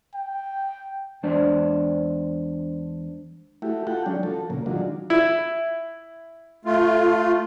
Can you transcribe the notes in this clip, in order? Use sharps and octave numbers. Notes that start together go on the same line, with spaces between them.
G5
E2 G#3 D4 C5 D5
A3 E4 F#4 G4
F4 F#4 A4 F#5 G5
F#3 G#3 C#4 D4
F3 F#4 A4
A#2 C#3 A#3
D#3 F#3 G#3 D4 F4 F#4
E4
A3 F4